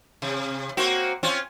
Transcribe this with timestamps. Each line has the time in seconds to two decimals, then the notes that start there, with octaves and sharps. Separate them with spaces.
0.22 C3
0.77 A#3 C4 F#4
1.23 C4 C#4 F4